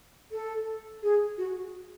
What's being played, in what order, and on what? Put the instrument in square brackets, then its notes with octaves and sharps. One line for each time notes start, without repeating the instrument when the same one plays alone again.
[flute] A4
G#4
F#4